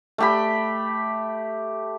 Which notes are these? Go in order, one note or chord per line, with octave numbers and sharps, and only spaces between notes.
A3 G4 B5